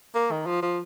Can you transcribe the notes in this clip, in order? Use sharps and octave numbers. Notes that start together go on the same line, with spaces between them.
A#3
D#3
F3
F3